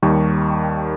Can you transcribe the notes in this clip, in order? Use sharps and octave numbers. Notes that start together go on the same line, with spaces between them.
D#2 D#3 G3 C#6